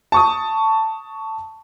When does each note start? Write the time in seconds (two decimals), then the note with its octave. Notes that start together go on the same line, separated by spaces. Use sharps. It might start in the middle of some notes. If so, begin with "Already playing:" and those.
0.12 A5 C#6 D#6